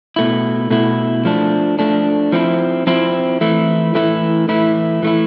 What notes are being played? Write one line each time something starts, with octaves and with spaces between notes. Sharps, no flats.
B2 A3 E4
B2 A3 E4
F3 A3 D4
F3 A3 D4
F3 C4 E4
F3 C4 E4
E3 A3 E4
E3 A3 E4
E3 A3 E4
E3 A3 E4